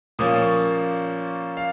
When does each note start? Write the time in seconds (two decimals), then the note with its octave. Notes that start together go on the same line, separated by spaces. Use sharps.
0.19 A#2 F3 A#3 C#4 D#6
0.42 C#6
1.57 F5